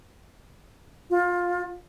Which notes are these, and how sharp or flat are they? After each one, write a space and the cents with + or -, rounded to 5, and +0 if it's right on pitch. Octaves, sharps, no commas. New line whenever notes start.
F4 +20